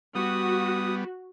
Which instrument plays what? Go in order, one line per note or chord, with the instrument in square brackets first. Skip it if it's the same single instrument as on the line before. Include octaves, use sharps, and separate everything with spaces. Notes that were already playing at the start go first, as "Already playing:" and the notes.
[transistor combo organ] G3 B3 [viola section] F#4 [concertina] D#6